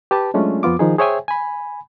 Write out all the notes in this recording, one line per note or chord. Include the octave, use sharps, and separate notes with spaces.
G4 B4 A5
F#3 G#3 A3 C#4 D4 F4
F2 F3 B3 F4 D6
D#3 F3 D#4 G#4
G#4 C5 C#5 E5 G5 G#5
G#5 B5